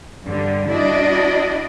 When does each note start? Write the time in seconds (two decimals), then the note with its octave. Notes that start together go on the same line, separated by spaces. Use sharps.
0.25 G2 D3 G3
0.69 D4 E4 F#4 D5 D#5